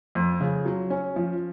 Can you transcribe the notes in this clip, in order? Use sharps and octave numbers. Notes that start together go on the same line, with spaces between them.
F2
C#3
F#3
C#4
F3